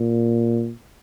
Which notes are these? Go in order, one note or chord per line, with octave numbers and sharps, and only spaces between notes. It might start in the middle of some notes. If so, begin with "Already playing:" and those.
Already playing: A#2